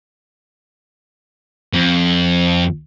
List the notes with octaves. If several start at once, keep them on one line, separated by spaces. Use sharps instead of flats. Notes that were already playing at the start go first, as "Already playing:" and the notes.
F2